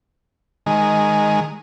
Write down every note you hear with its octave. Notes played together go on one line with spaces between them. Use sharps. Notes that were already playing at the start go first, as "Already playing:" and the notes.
D#3 G#3